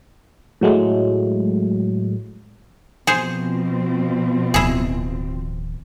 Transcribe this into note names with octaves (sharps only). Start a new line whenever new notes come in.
A2 F#3 G#3 A3
B2 F3 C4 G#4 C5
D1 D#3 E4 G#4